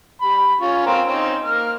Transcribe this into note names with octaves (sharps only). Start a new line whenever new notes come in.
G3 B5
C#4 F4 C#6
C4 A#4 F5
C4 C#4 D#4
A#3 F6